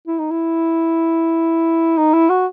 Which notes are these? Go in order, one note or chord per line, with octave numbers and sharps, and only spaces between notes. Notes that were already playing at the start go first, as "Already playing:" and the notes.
E4
D#4
E4
D#4
E4
F#4